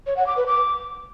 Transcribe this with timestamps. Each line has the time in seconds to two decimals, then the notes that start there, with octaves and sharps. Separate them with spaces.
0.07 C#5
0.17 F#5
0.27 D6
0.37 B4
0.47 D6